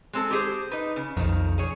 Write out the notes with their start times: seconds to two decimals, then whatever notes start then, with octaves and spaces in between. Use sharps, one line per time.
0.13 G#3 C4 A4
0.31 G4 G#4 C5
0.72 D#4 B4
0.96 C#3
1.17 B1 F2 D#3 F3
1.58 G#4 C#5